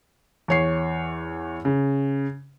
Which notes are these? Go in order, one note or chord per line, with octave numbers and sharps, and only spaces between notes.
E2 C#5 C7
C#3